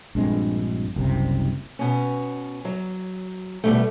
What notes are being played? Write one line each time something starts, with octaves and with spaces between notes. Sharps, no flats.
A#1 G2 G#3 C4
F#1 C2 C3
B2 C#4
F#3
B2 G3 A3